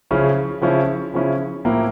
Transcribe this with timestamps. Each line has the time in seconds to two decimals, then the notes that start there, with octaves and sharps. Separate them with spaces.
0.11 C#3 F3 C#4 E4
0.62 C#3 F3 C#4 E4
1.14 C#3 F3 C#4 E4
1.65 A2 F3 A#3 E4